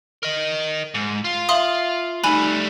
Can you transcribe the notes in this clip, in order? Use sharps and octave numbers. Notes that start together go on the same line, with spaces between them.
A#4 D#5
G#2
F4
E5 F5 C6 D#6 F#7
G3 A3 D#4 G#5 B5 F#6